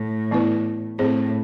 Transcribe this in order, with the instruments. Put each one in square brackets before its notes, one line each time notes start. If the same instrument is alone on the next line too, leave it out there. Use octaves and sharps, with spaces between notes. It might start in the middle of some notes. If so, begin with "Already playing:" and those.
Already playing: [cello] A2
[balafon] E3 B3 E4 B4
[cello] A2 [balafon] C4 G#4 C5